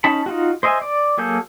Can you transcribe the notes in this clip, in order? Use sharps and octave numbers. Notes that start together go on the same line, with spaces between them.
C#4 D#4 A5 B5
D#4 F4 F#4
C5 D#5 E5 G#5
D5
F#3 A#3 G#4 A4 G6